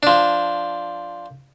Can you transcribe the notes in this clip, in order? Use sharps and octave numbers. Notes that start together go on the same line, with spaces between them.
F3 D4